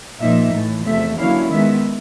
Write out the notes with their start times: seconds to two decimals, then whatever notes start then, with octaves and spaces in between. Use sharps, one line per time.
0.21 A#2 F3 A#3 D#4 E5
0.53 A2 E3 A3
0.85 E2 C3 F3 A3 E5
1.17 D3 F#3 A#3 C#4 E4 F5
1.50 D#3 G#3 B3 E5